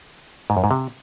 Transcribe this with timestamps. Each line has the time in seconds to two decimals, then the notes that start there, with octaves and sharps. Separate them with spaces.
0.50 G#2
0.57 F#2
0.64 G#2
0.71 C3